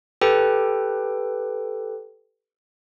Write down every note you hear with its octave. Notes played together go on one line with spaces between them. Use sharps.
G4 A4 B4 G5